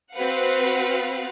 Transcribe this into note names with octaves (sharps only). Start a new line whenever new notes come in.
C4 F#4 B4 F5 F#5